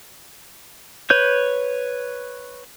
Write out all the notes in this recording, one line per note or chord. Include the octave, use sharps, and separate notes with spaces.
B4 C#5 G6